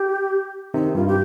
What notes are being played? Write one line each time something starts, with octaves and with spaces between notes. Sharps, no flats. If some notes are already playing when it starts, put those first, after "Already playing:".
Already playing: G4
C3 D#3 D#4
G2 F4
G4